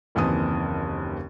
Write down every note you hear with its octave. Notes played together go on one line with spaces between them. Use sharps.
F#1 D#2 E3 C4 A5 D#6